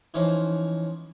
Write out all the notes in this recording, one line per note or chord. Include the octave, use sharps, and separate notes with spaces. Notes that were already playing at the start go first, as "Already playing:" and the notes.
E3 F3 C#4 D#4 C5